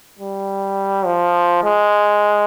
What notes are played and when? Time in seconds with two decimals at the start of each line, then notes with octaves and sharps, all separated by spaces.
0.19 G3
1.06 F3
1.64 G#3